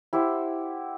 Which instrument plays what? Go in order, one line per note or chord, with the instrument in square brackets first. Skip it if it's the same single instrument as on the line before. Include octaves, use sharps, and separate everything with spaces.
[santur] E4 G4 C5 F#5